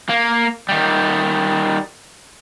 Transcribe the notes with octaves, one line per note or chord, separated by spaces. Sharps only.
A#3
D#3 G3